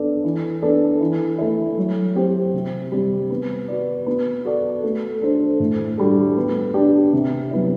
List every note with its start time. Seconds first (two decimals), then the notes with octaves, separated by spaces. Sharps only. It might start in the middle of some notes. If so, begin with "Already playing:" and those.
Already playing: B3 D4 A4 D5
0.24 E3
0.62 B3 D4 A4 D5
1.01 E3
1.38 A3 E4
1.78 F#3
2.15 C4 G4 C5
2.53 C3
2.92 G3 C4 G4
3.30 B3
3.68 F#4 B4 D5
4.06 B3
4.45 F#4 A4 D5
4.83 A3
5.21 D4 A4 C5
5.60 A2
5.97 G3 D4 F#4 A4
6.37 B3
6.74 D4 G4 D5
7.13 C3
7.51 F#3 B3 E4